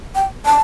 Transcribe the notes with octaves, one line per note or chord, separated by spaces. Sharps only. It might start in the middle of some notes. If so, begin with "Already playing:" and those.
G5
A5